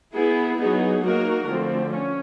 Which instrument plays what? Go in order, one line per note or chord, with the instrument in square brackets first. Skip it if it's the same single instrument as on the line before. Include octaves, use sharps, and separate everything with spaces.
[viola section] B3 E4 G#4
F#3 B3 D#4 G#4
F#3 A#3 D#4 F#4 A#4
D3 F3 A3 C4
C#4